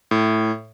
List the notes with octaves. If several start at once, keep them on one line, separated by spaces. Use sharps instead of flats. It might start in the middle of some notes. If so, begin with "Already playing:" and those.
A2